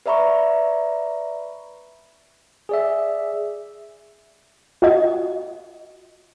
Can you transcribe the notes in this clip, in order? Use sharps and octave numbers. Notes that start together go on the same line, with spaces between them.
B4 D5 E5 A#5 B5 C#6
G#4 D5 E5
F4 F#4 D#5 G#6